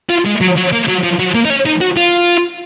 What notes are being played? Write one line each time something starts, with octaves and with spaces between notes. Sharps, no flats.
F4
G#3
F#3
F#3
A#3
F#3
F3
F#3
A#3
D#4
C#4
D#4
F#4
F4